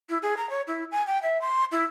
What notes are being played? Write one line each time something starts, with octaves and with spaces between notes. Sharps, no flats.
E4
G#4
A#5
C#5
E4
G#5
G5
E5
C6
E4